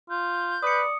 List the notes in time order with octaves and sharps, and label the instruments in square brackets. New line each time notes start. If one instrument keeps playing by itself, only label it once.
[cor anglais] F4 [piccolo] G6
[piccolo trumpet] B4 [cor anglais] D5 [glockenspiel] D#6 C#7